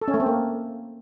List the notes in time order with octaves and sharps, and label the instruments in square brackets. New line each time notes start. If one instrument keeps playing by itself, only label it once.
[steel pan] A4
C#4
A3
C4
A#3